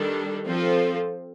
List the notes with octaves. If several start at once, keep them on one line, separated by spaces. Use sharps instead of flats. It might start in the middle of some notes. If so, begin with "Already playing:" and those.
Already playing: D#3 G3 D4 A4
F3 C4 F4 A4